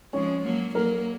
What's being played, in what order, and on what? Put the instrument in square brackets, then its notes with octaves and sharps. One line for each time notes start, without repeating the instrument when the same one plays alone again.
[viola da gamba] F3 G#3 [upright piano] C#4
[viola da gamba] F#3 A#3
[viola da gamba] F#3 A#3 [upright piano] A#4